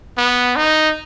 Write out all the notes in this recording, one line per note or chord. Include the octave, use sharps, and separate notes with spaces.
B3
D#4